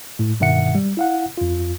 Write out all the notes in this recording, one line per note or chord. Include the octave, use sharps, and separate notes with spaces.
A2
G2 B2 D#3 E5 F#5 C#7
G3
E4 F5 F#5
F2 F4